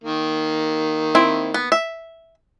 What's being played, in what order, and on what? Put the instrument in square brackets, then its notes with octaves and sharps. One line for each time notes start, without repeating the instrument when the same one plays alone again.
[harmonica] D#3 A#3
[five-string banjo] C4 E4
B3
E5